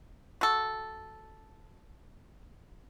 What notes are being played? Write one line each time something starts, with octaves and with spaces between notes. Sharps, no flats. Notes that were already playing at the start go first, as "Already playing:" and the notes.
F#4 A4